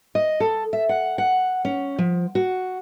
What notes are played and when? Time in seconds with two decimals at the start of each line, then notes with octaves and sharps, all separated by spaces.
0.15 D#5
0.40 A4
0.73 E5
0.89 F#5
1.18 F#5
1.65 C#4
1.98 F3
2.35 F#4